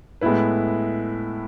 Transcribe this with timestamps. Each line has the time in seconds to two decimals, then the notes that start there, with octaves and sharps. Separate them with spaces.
0.21 A2 G#3 B3 E4 B4